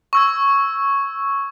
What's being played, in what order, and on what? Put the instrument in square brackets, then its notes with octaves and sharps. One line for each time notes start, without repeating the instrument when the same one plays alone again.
[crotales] C#6 E6 G#6